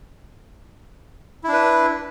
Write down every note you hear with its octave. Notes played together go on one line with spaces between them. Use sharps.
D4 E4 B4